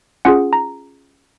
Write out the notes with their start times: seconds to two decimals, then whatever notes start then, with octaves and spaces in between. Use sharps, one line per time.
0.25 C#4 F4 G#4 F#5
0.53 A#5